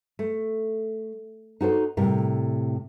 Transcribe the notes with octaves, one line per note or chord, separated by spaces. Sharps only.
A3
D#4 F#4 A4 C5
A2 C3 G3 A#4